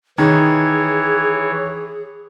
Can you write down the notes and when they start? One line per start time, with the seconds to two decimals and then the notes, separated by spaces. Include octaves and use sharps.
0.18 D#3 E3 G#4 C#5